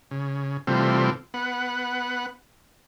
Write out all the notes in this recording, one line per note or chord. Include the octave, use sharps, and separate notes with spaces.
C#3
C3 E3 G3 A3 C4 F4
B3 F#5